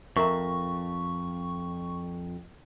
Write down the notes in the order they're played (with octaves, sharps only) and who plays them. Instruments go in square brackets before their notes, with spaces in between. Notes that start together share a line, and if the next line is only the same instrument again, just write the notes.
[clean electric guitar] F2 [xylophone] A#4 E5 A#5 [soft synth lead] C#6